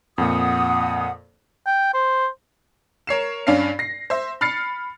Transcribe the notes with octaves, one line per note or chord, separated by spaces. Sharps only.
F2 A#2 F#5 D#6
G5
C5
A#4 C#5 C7 E7
G2 C#4 D4 F5 C7
A#6 C7
C5 E5
B5 F6 A6 C7 C#7